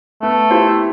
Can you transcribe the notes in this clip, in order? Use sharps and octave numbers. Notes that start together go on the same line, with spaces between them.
A3 B3
E4 G4 C5